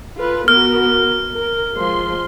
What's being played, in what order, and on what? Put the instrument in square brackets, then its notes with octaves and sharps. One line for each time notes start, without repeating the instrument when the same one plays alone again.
[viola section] F4 A4 B4
[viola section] B3 F#4 A#4 [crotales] F6
[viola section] A#4
F3 G#3 C6